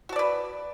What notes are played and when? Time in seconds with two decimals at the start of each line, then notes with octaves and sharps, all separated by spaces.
0.09 F#4
0.13 A5
0.16 D5
0.19 B4